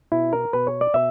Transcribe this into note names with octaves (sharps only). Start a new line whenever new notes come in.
B2 E4
A#4
B2 B4
C#5
D5
B2 E5